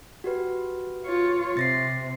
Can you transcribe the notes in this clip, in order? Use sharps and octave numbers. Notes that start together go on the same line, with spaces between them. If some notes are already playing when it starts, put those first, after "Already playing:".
F#4 G4 B4
F4 C#5
C3 A6 A#6 C7